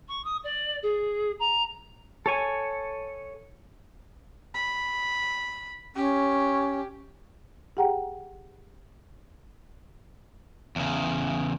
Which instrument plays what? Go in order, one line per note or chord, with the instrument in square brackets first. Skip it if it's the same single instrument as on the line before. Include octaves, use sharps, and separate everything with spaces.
[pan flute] C#6
D#6
D5
G#4
A#5
[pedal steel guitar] A4 C#5 G#5
[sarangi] B5
[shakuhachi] C#4 [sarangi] G4
[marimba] G4 G#4 F#5 G5 A#5
[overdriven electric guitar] E2 C#3